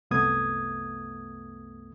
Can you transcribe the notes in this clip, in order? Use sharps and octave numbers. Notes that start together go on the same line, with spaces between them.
C2 F#2 A3 B3 D#6 G#6